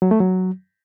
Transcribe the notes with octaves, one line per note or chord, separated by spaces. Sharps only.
F#3
A3
F#3